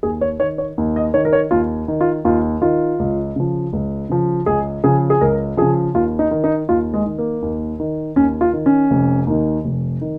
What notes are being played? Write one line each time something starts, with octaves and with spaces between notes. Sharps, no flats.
D#2 G#4
C#5
D#3 C#5
C#5
D#2
D#5
D#3 C#5
A#4
C#5
D#2 F4
D#3
F4
D#2 F4
D#3 F4
C#2
C#3 F3
C#2
C#3 F3
C#2 G#4
C#3 F3 G#4
G#4
C#2 A#4
C#3 F3 G#4
D#2 F4
D#4
D#3
D#4
D#2 F4
G#3
D#3
A#3
D#2
D#3
D#2 C#4
F4
D#3
C#4
F1
D#2 D#3
F1
D#3